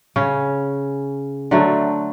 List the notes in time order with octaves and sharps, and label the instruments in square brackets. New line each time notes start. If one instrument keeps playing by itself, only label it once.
[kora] C#3 C#4
D3 F#3 A3